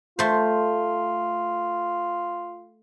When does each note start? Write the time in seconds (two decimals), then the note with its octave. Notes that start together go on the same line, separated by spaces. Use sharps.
0.19 A3 F4 C5